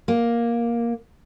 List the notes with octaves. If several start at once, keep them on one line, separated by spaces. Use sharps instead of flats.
A#3